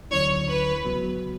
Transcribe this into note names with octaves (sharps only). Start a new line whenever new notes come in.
D2 D3 F#3 C#4 E4 C#5
B4
C#2 C#3 F#3 B3 F#4